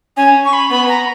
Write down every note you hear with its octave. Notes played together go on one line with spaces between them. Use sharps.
C#4 G#5
C#6
B5
B3 B5
A#5